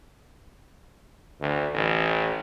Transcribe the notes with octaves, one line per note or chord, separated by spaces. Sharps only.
D2
A1